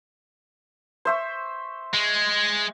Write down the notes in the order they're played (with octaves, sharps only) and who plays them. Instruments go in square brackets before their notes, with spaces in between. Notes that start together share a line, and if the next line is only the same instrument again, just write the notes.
[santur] C5 E5 C#6
[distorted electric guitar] G#3